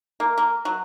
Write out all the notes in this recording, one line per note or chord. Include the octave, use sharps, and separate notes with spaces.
A#3
A#3
F#3